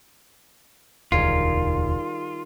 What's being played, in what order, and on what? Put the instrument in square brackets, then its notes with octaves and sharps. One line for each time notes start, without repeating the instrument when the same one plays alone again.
[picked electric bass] E1 D2 [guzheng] D#3 G3 G#4 [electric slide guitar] F4